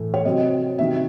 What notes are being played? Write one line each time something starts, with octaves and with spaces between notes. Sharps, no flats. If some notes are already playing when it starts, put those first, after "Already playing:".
Already playing: A2 E3 A3
C#5
C3 F#3 C4 D#5
C3 D#3 F#3 E5